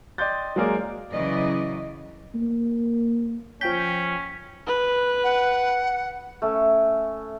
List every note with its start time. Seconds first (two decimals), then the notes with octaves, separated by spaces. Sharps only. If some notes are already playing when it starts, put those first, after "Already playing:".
0.18 D5 D#5 G5 C6 G6 A6
0.56 F#3 G#3 A#3 G#4 A#4 D5
1.11 C#3 E3 F#3 D5 D#5
2.35 A#3
3.61 F3 C#4 G5 G6 B6
4.67 B4
5.24 F#5
6.42 A3 C#4